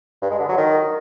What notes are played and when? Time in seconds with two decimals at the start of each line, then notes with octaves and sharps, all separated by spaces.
0.22 G2
0.31 G#3
0.40 D3
0.49 F#3
0.58 D#3